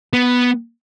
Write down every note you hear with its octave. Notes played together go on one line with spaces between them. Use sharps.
B3